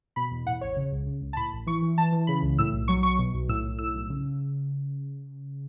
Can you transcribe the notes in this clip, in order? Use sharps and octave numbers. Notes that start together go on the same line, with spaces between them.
B2 B5
E2
A2 F#5
A1 C#5
C#3
C#2
C#3
C#2
A5
A2 B5
A1
E3 C#6
E3
E3 A5
E3
C#3 B5
C#2
A2 E6
B1
F#3 C#6
F#3 C#6
B2
B1
A2 E6
B1
A2 E6
B1
C#3